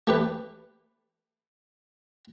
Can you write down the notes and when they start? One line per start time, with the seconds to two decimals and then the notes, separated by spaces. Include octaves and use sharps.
0.07 A3 G4 B4